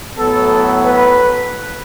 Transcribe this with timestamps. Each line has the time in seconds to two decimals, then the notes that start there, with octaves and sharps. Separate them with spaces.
0.18 A2 F#3 B3 A4
0.83 B4